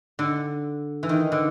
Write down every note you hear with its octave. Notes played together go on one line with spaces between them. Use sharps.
D3
E3
D#3
D3